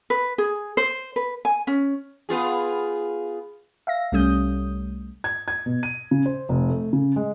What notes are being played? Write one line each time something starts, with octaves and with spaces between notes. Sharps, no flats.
B4
G#4
C5
B4
G#5
C#4
B3 F4 G#4
E5 F5 A#6
C2 G3 A3 C#4 D#6 G6
G#6
G#6
B2
D#7
C#3
C5
F1
A3
C#3
G#3